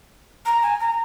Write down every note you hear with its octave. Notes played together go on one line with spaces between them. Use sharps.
A#5
G#5
A#5